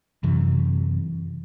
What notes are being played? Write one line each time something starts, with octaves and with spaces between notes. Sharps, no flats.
F#2 C3 E3